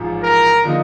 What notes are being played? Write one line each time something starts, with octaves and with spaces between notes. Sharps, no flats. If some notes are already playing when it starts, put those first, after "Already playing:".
Already playing: A1 G#2 F3
A#4
D3 F3 A#3 D#4